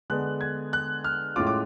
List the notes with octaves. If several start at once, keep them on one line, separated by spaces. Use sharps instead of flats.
D3 G#3 B3 D4 F#6
G#6
F#6
F6
A2 G#3 C#4 F4 D6
D6